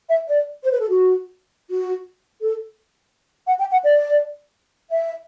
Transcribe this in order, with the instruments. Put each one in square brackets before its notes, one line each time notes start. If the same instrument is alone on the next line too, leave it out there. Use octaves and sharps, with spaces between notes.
[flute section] E5
D5
C5
B4
A4
F#4
F#4
A4
F#5
G5
F#5
D5
E5